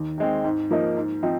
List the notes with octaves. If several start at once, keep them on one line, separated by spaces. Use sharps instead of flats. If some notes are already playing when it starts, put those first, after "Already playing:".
Already playing: D#2
D#3 G#3 C4
G#2
F3 A#3 D#4
G#2
F3 C4 D#4